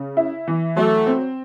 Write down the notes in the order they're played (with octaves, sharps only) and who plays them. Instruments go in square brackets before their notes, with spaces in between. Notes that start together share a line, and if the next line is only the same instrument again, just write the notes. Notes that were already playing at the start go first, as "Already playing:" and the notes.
Already playing: [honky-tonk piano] C#3
E4
E3
[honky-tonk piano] F#3 [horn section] A3
[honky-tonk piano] C4